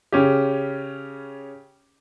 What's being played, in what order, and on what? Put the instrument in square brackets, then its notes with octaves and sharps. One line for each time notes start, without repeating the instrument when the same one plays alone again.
[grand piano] C#3 C#4 G4